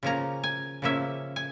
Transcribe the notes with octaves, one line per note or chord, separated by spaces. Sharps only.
C#3 F3 A#3 C#4 A#5
G#5
C#3 F3 A#3 C#4 E5
G#5